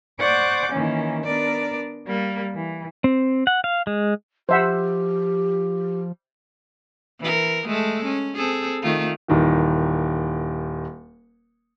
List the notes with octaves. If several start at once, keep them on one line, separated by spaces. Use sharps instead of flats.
C5 D5 F#5 C#6 D6 G6
D#3 E3 A#3 C#4
B3 D4 A#4 D5
G3 A#3
E3
C4
F#5
F5
G#3
F3 G4 C5 E5 F#5
E3 A#4
G#3 A3 A4
C#4
C4 G#4 A4
D#3 A3 F4
D#1 D#3 E3